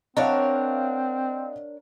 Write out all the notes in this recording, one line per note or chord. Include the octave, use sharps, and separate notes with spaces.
C4 D4 A#4 C#5 D#5 F5 F#5